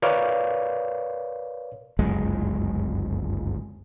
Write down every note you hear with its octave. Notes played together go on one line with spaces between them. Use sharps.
A#4 B4 C#5 D5 F5
G1 C#2 F#2 G#3